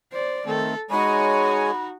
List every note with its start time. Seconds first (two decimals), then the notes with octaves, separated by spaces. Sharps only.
0.12 C5 D5
0.46 D#3 A3 C4 A4
0.90 G#3 D#4 F#4 C#5 G#5 B5